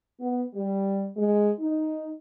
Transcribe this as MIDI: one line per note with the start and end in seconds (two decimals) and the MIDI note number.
0.20 0.42 59
0.54 1.06 55
1.16 1.49 56
1.58 2.09 63